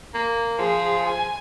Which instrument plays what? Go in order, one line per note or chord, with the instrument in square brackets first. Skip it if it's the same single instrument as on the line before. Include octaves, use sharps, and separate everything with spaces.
[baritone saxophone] A#3
[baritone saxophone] F3 [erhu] G#4
[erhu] G#5